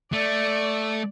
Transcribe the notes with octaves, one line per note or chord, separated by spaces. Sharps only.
A3 D5